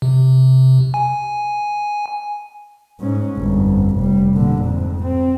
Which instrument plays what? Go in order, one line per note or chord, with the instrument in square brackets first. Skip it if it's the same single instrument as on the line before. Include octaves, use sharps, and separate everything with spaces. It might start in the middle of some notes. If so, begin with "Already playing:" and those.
[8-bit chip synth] C3
G#5
[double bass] G#2 C#4
G1 F2
F1 G3
A#2 D3
F2 G#2
C4